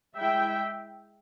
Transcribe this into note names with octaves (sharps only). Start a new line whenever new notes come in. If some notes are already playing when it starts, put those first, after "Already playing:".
G#3 E4 E5 G5